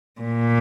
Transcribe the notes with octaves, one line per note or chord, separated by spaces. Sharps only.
A#2